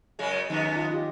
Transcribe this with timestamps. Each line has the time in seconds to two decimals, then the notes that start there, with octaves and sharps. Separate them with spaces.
0.19 F#2 C#3 G#3
0.50 F2 G#2 D#3 B3 C#4 D#4
0.76 D#3 F4 D#5
0.92 F4 G4